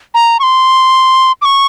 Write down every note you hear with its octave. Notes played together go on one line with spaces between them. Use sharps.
A#5
C#6
C6
D6
C#6